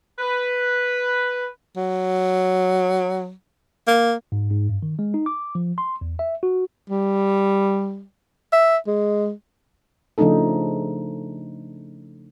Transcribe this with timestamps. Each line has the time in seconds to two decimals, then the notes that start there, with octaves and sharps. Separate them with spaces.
0.19 B4
1.77 F#3
3.87 A#3
4.32 G#2
4.51 G#2
4.69 G2
4.83 D#3
4.99 G#3
5.14 D#4
5.26 D6
5.55 F3
5.78 C6
6.01 E2
6.19 E5
6.43 F#4
6.90 G3
8.53 E5
8.87 G#3
10.18 C#3 F3 A3 D4 D#4 A4